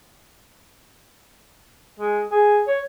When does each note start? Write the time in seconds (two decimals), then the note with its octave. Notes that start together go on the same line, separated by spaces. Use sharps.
2.00 G#3
2.31 G#4
2.67 C#5